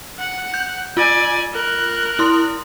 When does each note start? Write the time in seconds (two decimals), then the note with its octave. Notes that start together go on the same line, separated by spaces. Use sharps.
0.19 F#5
0.54 G6
0.97 F4 D5 G#5
1.52 A#4 F#6
2.19 E4 C6